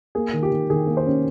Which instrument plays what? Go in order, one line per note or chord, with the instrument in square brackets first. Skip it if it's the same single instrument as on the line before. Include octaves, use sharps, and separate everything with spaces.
[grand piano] A#3 [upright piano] G#4
[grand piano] D#3
[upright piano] G4
[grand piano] D#3
[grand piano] D#3 [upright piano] G#4
[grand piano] A#3
[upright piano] C5
[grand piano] C#4